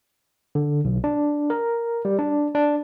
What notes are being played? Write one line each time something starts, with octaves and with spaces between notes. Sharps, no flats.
D3
B1
D4
A#4
G3
D4
D4